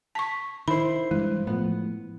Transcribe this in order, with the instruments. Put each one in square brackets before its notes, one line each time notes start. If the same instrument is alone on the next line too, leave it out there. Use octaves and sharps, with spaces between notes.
[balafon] A5 C#6 [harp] B6
[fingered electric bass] D#3 [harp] E4 C5 [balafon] B5
[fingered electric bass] G2 E3 [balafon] G#3
[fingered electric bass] A2 F3 [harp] B3